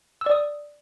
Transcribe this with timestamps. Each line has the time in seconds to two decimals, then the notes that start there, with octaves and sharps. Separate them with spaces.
0.21 E6
0.26 D5
0.31 D#6